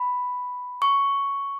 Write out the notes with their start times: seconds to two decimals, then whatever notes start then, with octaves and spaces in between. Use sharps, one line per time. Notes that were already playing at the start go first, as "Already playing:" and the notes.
Already playing: B5
0.82 C#6